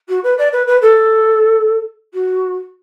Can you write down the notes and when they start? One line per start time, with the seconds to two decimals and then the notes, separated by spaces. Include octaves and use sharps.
0.08 F#4
0.23 B4
0.37 D5
0.52 B4
0.67 B4
0.81 A4
2.14 F#4